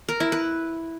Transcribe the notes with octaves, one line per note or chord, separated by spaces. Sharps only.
A#4
E4
B4